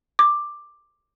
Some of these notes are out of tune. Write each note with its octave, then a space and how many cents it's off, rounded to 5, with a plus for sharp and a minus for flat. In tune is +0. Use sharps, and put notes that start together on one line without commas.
D6 +10